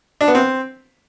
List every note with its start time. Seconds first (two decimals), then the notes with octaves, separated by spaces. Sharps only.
0.21 D4
0.28 B3
0.35 C4